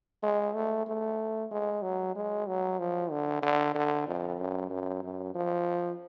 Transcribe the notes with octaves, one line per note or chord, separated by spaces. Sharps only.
G#3
A3
A3
G#3
F#3
G#3
F#3
F3
D3
D3
D3
F2
F#2
F#2
F#2
F3